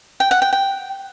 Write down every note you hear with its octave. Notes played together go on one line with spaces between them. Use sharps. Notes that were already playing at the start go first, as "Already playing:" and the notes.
G5
F#5
G5
G5